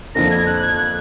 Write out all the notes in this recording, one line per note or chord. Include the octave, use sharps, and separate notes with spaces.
F2 D3 F3 A#3 D4 A#6
G#6
F#6
G#6
F#6